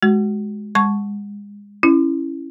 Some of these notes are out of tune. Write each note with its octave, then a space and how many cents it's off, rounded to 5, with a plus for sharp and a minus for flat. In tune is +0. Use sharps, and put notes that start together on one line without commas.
G#3 +10 F#4 +15
G#3 -30 A5 -5 C#6 +0
C#4 -10 E4 +10